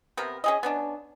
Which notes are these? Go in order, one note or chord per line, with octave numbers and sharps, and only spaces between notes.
C3 B3 A#4
C#4 G#4 D#5
B3 C#4 D4